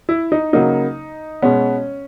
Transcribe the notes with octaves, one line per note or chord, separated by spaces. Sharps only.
E4
D#4
C#3 F#3 A#3 D#4
B2 G#3 B3 C#4